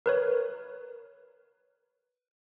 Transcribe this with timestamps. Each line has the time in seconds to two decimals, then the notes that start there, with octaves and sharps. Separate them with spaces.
0.06 A#4 B4 C#5